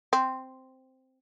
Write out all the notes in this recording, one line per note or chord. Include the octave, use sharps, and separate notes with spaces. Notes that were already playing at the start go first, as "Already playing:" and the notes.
C4